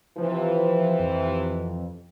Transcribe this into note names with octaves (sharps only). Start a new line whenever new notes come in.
C3 E3 F3
F2